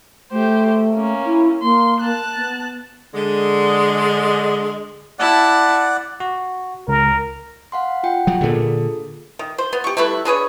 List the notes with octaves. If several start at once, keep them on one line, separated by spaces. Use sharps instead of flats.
A3 G4 C5
A#3 C#4
E4
A#3 C6
A5 F#6
B3
D3 G#3
E4 D5 F#5 A5
F#4
C#2 A#4
F5 F#5 C6
F4 F#5 G5
F3 F#3 F4
A#2 D3 F4 G#4 A4
D#3
C5
B3
G4 C#6
G3 A3 E4 B4
D4 G#4 B4 C#5